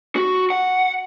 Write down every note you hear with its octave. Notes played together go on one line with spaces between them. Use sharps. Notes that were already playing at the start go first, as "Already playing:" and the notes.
F#4
F#5